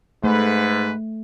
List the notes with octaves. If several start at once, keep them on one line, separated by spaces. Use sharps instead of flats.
G#2 A3 B4